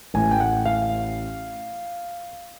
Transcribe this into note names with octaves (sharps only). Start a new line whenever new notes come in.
A1 A2 E3 G#5
G5
F#5
F5